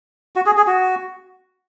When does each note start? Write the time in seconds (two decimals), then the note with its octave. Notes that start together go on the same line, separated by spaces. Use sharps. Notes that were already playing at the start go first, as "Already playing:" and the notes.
0.36 F#4
0.46 G#4
0.57 G#4
0.67 F#4